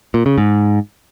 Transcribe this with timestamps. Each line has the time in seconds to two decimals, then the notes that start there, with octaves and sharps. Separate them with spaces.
0.14 A#2
0.26 C#3
0.38 G#2